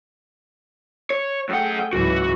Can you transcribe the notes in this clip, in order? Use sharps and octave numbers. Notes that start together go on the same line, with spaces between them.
C#5
F#2 A3 G#4 F#5 G5
C#2 G#2 E3 F#3 F#4